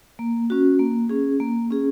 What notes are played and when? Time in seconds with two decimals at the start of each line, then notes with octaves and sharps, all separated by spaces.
0.19 A#3
0.50 C#4 F#4
0.79 A#3
1.09 C#4 G#4
1.40 A#3
1.71 C#4 G#4